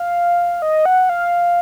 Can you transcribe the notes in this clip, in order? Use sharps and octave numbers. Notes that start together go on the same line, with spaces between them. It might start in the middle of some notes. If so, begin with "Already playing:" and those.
Already playing: F5
D#5
F#5
F5